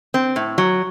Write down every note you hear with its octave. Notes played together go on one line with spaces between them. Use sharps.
C4
A2
F#3